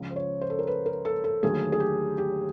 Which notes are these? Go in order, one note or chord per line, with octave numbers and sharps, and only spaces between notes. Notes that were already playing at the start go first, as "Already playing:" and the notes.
Already playing: C#2 C#3 F3
C5
C#5
C5
A4
A#4
B4
A#4
A4
A4
D#2 D3 F#3 A3 G#4
G#4
G4
G4